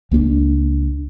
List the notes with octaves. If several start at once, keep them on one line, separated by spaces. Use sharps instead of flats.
C#2 A#3 C#4 D4